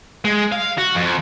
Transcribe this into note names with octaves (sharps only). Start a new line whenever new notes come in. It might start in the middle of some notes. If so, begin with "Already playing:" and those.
G#3
F5
F#4
F2